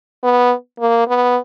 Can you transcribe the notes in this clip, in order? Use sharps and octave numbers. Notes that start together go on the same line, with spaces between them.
B3
A#3
B3